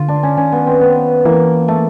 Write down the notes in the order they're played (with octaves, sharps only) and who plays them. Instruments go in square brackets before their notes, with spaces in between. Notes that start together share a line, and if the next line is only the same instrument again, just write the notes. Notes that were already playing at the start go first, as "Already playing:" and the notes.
Already playing: [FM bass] D3 [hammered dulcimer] F4
[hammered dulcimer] D4
C#4
[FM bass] D#3 [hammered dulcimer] C#4
[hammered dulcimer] B3
C4
B3
[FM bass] E3 [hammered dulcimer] A#3
[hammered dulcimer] A3